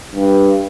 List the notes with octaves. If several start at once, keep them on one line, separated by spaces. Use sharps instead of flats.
G2